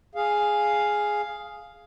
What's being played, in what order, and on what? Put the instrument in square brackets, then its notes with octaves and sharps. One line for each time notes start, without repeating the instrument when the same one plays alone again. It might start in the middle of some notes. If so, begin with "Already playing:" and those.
[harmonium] G#4 F5